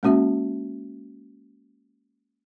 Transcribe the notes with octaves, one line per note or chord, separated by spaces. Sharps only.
G#3 A#3 C#4 F#4 E5 A5